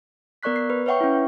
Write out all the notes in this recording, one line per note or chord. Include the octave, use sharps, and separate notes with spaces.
B3 A#4 D5 C#6 F#6 B6
C7
B4
B4 C#5 E5 F#5 G5 C#6
C#4 E4